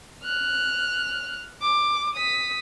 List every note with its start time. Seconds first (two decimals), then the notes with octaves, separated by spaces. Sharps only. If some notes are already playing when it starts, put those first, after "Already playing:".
0.25 F6 F#6
1.62 D6
2.15 D#6 B6